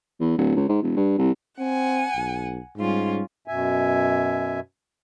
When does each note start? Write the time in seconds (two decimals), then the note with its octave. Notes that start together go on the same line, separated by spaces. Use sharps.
0.21 E2
0.38 D1
0.56 C#2
0.69 G#2
0.82 E1
0.96 G2
1.18 C2
1.59 C4 F#5 G#5
2.15 B1
2.77 G#2 G3 C#4 F4
3.48 F#2 B2 E5 G#5